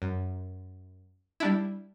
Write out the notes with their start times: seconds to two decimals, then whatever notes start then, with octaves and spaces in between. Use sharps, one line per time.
0.02 F#2
1.40 G3 D4 E4